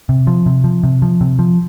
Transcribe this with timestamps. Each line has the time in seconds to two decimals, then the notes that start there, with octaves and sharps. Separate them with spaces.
0.09 C3
0.27 F3
0.46 C3
0.64 F3
0.83 C3
1.02 F3
1.21 C3
1.39 F3